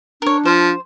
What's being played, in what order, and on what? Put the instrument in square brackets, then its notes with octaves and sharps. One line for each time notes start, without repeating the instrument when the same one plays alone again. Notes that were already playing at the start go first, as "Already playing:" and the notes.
[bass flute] D4 [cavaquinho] A#4 C#5
[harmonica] F3 [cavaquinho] C5